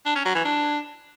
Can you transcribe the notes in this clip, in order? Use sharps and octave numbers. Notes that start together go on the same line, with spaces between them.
D4
C#4
F#3
E3
D4